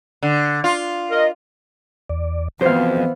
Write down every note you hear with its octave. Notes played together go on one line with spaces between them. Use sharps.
D3
F4
A#4 D#5
E2 D5
F2 E3 B3 F#4 C5 F5